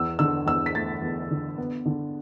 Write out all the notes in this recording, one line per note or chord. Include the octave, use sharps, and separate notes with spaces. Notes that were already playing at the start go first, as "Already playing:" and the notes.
Already playing: E2 E6
D3 E6
E2 E6
B6
A3 A6
E2
D3
B3
D3